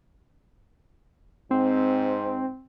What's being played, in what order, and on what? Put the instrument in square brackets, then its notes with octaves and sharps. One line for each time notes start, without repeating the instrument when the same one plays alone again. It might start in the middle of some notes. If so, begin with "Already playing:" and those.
[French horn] G#2 [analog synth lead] C4